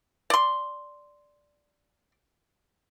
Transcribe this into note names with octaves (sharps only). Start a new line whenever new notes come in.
D5 C6